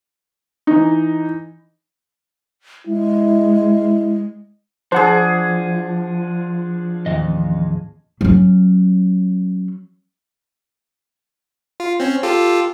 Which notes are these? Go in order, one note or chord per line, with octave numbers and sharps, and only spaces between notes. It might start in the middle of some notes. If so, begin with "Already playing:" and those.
E3 D#4
G#3 E4
F3 D4 G#4 C5 F#5
A1 D#2 F3 D#5
F#3 C#4
F4
C4 C#4
F4 G4 A4